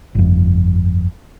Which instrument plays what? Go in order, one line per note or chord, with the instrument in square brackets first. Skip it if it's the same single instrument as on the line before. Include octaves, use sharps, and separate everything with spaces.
[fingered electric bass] G1 F2